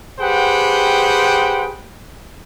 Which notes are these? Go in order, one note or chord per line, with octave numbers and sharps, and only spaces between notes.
G4 G#4 B4 C5 F#5 G5